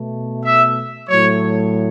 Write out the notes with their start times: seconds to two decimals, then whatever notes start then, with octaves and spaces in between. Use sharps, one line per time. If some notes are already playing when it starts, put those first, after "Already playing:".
Already playing: B2 A3
0.43 E5
1.08 A2 F#3 A3 C#5